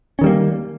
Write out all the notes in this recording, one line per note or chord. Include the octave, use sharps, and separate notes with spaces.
D#3 G3 A#3 C#4